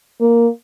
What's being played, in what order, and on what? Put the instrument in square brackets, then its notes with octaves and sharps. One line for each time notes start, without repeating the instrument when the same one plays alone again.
[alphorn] A#3